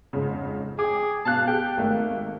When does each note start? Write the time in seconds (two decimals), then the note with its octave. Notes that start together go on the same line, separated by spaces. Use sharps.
0.13 F2 G#2 C#3
0.79 G#4 G5 D6
1.25 B2 F5 A5 F#6
1.47 G4 G5
1.77 G#1 A3 A#3